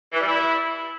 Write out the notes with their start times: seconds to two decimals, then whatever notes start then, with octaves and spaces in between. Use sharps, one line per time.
0.13 E3
0.20 G3
0.28 E4